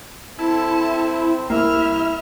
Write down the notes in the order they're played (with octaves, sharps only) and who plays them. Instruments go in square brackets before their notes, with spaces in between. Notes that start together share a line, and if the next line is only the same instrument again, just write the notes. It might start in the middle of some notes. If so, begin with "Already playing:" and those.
[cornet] C4 [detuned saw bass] E4 [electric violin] A4 A5
[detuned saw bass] C2 [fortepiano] A#3 [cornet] E4 [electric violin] E5 F6